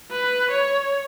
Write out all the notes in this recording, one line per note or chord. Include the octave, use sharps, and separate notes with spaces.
B4
C#5